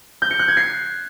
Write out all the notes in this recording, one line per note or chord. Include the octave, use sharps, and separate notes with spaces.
G6
C#7
F#6
G#6
C7